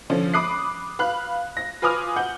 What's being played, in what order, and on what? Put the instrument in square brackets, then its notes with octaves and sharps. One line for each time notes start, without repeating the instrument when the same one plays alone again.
[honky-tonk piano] D3 F3 C#4
B5 D6 D#6 F#6 C7
B4 F5 B5 F#6
A#6
F4 B4 G#5 D6 D#6 F6
F#5 G6